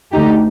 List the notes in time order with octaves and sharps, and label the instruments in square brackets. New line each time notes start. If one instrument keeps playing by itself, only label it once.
[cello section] D2 D3 A3 D#4 G4